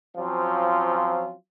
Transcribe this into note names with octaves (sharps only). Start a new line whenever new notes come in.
F3 F#3 C4 C#4 F4